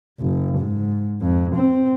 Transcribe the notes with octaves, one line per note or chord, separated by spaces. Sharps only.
F#1
G#2
F2
C4